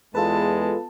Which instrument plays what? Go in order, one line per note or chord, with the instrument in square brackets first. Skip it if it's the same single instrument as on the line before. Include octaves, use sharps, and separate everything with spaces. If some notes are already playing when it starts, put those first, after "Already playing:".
[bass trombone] E2 [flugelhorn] G#3 [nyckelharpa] B3 A5 [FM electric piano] F4 A4 B4